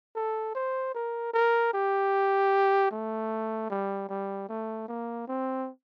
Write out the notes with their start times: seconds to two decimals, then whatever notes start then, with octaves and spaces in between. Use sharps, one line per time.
0.15 A4
0.55 C5
0.94 A#4
1.34 A#4
1.74 G4
2.91 A3
3.70 G3
4.09 G3
4.49 A3
4.88 A#3
5.28 C4